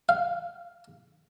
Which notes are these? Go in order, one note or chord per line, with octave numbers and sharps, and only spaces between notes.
F5